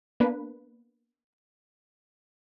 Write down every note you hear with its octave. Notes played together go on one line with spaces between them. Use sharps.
A#3 B3 D4 B4